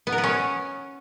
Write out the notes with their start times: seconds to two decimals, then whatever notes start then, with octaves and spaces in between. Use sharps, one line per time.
0.07 B3
0.12 A#4
0.18 B3
0.24 C#4